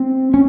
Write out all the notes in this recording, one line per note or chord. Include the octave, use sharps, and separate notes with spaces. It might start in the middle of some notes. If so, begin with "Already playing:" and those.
Already playing: C4
C#4